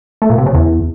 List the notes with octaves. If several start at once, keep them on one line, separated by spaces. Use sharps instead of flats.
A3
A#2
C3
C#3
E2